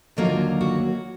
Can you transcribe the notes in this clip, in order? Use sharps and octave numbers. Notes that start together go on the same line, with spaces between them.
D#2 D3 F#3 A#3 F4
F#4